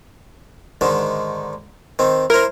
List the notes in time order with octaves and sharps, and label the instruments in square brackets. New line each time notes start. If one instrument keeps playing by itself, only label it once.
[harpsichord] G#2 D3 D#3
D#3 C4
[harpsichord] E4 C5 [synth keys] A#4